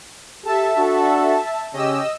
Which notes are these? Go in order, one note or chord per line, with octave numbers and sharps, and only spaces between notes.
G4 A4 E5 A5
D4 F#4 A4
C#3 C#4 G4 D#5 E6